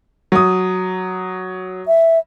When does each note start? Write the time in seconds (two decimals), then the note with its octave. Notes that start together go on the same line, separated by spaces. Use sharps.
0.32 F#3 D#6
1.87 E5